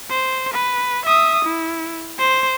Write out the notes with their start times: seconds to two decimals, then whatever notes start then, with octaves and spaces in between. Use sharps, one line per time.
0.10 C5
0.53 B4
1.06 E5 D#6
1.44 E4
2.18 C5